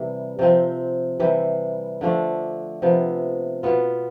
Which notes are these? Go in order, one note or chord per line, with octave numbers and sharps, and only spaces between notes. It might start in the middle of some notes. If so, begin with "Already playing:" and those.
Already playing: C3 E3 G3
C3 F3 C4
C3 E3 G3
D3 F3 A3 D4
C3 F3 B3
B2 B3 F4